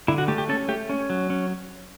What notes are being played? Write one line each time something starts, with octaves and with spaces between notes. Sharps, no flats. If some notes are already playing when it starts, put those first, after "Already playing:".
D3 E4
F#4
A3 G4
G4
C#4 A4
A3 G4
C#4
F#3
C#4